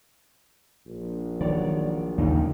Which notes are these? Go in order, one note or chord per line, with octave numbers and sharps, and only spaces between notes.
A#1
D#3 F#3 C#5 D5
A1 D#2 C#3 A#3 D#4